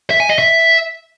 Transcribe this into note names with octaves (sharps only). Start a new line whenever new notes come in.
E5
G#5
D#5
E5